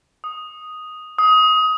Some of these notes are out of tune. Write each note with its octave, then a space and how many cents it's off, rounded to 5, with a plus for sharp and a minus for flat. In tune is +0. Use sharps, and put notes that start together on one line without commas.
D#6 +0
D#6 +20